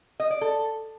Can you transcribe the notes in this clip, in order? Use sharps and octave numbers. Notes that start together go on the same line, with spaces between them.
D#5
D5
A4